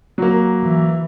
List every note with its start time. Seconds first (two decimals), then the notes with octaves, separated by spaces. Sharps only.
0.18 F#3 A#3
0.62 E3